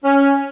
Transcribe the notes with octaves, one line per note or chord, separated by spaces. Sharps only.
C#4